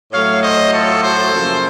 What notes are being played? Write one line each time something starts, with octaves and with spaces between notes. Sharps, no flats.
A2 F#3 A3 C#5 F5
C5 D#5
F4 A4
A4 C5
F#2 C#3 F3 A#3